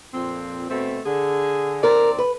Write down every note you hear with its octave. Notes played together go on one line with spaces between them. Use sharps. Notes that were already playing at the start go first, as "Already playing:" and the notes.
F2 A#2 C4
B2 A3 C4
D3 G#4
D#2 C4 A#4 D5
B4